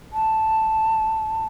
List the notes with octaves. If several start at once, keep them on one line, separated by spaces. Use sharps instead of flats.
A5